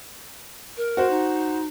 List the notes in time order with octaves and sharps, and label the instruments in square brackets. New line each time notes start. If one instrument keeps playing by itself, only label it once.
[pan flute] A#4
[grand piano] F#4 C5 F#5
[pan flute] D#4